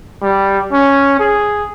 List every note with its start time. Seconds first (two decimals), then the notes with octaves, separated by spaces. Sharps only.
0.22 G3
0.72 C#4
1.19 G#4